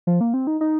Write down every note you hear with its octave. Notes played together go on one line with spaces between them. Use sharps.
F3
A#3
C4
D#4
D#4